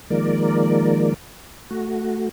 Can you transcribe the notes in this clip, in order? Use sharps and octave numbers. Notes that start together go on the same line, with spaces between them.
D#3 F3 G#3 A#3 A#4 D5
A3 F#4